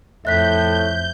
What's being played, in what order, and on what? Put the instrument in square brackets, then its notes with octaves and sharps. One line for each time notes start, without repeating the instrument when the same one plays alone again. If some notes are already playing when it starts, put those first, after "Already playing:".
[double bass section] F2 [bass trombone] A2 [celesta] E5 F#6 B6 [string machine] G6